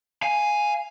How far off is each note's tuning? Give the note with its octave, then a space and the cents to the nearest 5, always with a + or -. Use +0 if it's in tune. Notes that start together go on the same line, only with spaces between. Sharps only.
F5 -5 G#5 +0